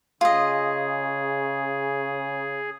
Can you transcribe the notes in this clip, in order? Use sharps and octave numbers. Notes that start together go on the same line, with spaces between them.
C#3 F4 G#4 D#5